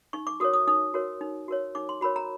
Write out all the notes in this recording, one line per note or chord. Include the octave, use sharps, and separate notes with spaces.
D#4 C#6
D6
F#4 A#4 C#5 D#6
D#6
D#4 D#6
F#4 A#4 C#5
D#4
F#4 A#4 C#5
D#4 D6
C6
F#4 A#4 C#5 B5
A#5